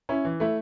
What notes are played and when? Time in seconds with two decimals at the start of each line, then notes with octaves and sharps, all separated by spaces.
0.09 C#4 E4
0.25 E3
0.40 A3 E4